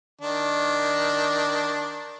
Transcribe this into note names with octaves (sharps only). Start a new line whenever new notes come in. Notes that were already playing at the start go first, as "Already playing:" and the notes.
D#3 D4